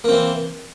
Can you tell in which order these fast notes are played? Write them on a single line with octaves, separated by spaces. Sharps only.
A#3 C4 E3